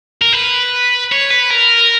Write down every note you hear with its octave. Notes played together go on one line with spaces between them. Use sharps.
A#4
B4
C#5
B4
A#4